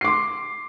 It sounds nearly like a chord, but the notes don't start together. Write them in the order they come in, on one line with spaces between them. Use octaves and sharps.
C7 D6 C6